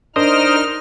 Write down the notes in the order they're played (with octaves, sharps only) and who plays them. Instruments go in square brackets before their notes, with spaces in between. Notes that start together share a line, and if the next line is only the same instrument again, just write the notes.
[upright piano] D4 [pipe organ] D#4 F6 [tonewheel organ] A#4 C5 D#5